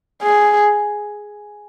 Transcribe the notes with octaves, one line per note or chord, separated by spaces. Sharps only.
G#4